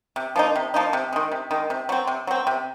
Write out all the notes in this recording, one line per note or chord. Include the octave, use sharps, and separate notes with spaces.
C3
F3 A#3 D#4
C3
F3 A#3 D#4
C3
D#3 G#3
C3
D#3 G#3
C3
F#3 C4
C3
F#3 C4
C3